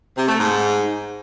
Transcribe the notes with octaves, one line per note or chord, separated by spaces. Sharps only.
C3
A3
G#2